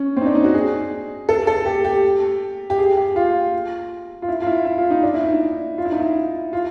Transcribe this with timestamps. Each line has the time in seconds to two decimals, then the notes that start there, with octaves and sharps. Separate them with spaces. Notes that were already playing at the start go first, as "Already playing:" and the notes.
Already playing: C#4
0.17 C4
0.21 D#4
0.26 D4
0.35 D#4
0.44 F#4
0.54 G#4
1.29 A4
1.47 A4
1.66 G4
1.85 G4
2.70 G4
2.78 G#4
2.97 G4
3.16 F4
4.22 F4
4.28 E4
4.42 F4
4.47 E4
4.65 E4
4.78 F4
4.90 D#4
5.03 D4
5.14 E4
5.22 D#4
5.78 F4
5.85 E4
5.92 D#4
5.99 E4
6.53 F4